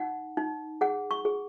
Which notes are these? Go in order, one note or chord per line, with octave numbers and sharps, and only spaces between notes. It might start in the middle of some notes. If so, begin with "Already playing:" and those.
Already playing: D#4 F#5
D#4
G#4 F#5
C#6
G#4